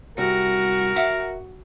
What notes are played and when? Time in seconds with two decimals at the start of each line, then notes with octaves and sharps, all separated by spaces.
0.18 C2 F#4 A#4
0.96 E5 F#5